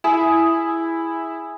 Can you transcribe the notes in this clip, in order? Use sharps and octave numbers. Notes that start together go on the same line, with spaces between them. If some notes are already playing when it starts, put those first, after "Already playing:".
E4 G#4